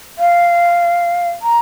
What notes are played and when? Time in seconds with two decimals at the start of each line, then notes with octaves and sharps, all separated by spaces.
0.18 F5
1.42 A#5